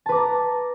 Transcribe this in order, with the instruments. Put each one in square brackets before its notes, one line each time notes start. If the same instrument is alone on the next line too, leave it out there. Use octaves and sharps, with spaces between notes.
[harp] A5
B4
D6
A#5